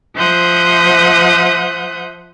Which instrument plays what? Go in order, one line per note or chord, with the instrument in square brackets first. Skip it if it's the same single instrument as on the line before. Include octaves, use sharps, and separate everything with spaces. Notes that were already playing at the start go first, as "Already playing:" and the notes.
[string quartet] F3 C5 E5 F#5 D#6 G6